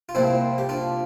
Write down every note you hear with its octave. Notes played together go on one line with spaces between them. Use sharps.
F4
C2 A#2 F3 C4 E4
G4
D4 F4